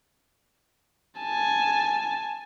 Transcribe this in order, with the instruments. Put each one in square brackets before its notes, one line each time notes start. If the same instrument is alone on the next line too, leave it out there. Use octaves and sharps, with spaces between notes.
[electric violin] G#5 A5